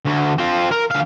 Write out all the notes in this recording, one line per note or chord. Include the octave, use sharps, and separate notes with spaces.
D2
C4 F4
A#4
D2 F5